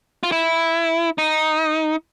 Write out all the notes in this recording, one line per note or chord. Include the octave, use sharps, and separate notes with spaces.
F4
E4
D#4